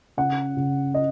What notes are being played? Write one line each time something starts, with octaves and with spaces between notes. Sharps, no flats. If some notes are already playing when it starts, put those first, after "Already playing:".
C#3 F#5
C#3
D#5